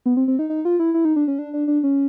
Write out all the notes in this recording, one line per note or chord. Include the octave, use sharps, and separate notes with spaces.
B3
C4
C4
D#4
D#4
F4
E4
E4
D#4
D4
C#4
D4
D4
D4
C#4